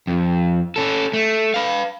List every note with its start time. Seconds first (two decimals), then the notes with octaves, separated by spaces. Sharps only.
0.07 F2
0.76 C#4 A4
1.13 A3
1.54 B4 F5